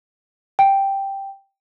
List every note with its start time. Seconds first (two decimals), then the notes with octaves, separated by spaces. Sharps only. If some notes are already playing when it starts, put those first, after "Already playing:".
0.59 G5